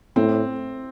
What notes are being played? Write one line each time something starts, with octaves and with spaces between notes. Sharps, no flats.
A2 C4